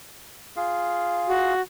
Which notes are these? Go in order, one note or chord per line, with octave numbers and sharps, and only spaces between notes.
F4 G#4 F5
F#4